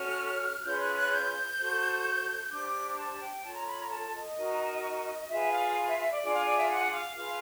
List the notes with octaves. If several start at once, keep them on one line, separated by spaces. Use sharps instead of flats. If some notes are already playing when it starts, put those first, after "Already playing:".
Already playing: C#4 F#4 A4 F6
C#4 F4 G#4 B4 G6
F#6
F#6
G6
F#4 A4 C5
D4 G4 C5 D6
A5
G5
F4 A4 C#5 A5
A#5
B5
A#5
A5
D#5
D#4 F#4 A#4
F4 G#4 B4 E5
F5
E5
E5
D5
D4 F4 G#4 D5
F5
D5
E5
F#5
F5
F4 G#4 B4 F5